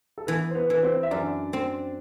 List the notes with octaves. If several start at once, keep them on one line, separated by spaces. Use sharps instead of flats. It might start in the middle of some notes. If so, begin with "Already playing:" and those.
A4
E3 B3 B4
C5
B3 B4
E3 B4
C4 C5
E5
F#2 D4 D5
C4